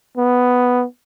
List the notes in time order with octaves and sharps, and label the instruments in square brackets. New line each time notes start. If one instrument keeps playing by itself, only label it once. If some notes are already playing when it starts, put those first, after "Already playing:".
[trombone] B3